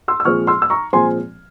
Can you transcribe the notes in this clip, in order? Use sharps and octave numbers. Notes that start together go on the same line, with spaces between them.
C6 E6
E6
A#2 F3 G#3 C4 C#6 F6
C6 E6
E6
A#5 C#6
A#2 F3 G#3 C4 G#5 C6